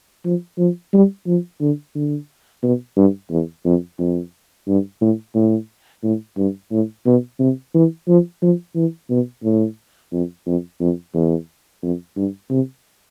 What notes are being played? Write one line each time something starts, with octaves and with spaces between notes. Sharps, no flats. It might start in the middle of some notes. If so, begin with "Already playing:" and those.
F3
F3
G3
F3
D3
D3
B2
G2
E2
F2
F2
G2
A2
A2
A2
G2
A2
B2
C3
E3
F3
F3
E3
B2
A2
F2
F2
F2
E2
F2
G2
C3